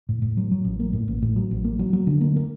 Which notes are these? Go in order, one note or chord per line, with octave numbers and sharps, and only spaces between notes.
A2
A2
F#3
F#3
A1
A#3
A2
A1
A2
F#3
A1
A#3
F#3
F#3
D3
A#3
A#3